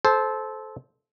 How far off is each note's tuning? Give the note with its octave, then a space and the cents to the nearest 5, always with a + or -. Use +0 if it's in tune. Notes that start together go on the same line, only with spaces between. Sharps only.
A4 -20 C5 +0